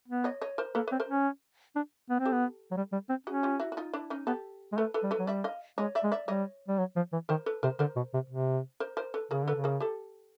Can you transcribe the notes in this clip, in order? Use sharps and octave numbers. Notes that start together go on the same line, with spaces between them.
B3
C#5 D#5
C#5 D#5
A#4 C5
A#3 A4 B4
C4 B4 C#5
A#4 C5
C#4
D4
B3
C4
G4 A4
B3
F#3
G3
G3
C4
C#4 F#4 G#4
F4 G4
E4 F#4
F#4
D#4 F4
D4 E4
C#4 D#4
B3 G4 A4
G#3
A3 A4 B4
A4 B4
G3
A4 B4
F#3
G3 D5 E5
D#5 F5
G#3 C#5 D#5
D5 E5
G#3
D5 E5
G3 C#5 D#5
G3
F#3
F3
E3
D#3 A#4 C5
A4 B4
C3 A#4 C5
D3 A#4 C5
B2
C3
C3
A#4 C5
A#4 C5
A4 B4
C#3 G#4 A#4
D3 A4 B4
C#3
G#4 A#4
G4 A4